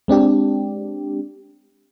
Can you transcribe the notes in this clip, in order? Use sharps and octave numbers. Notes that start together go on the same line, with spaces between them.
G#3 C4 D4 G4